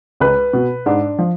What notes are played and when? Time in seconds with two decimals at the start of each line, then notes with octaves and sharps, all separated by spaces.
0.20 C#2 B4
0.53 B2
0.86 G#2 D4
1.19 F3